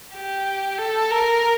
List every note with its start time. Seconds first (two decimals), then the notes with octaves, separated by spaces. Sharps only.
0.14 G4
0.78 A4
1.11 A#4